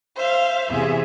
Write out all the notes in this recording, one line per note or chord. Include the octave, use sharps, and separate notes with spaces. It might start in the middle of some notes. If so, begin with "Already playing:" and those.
C5 E5 F5
E2 C3 E3 G#4 E5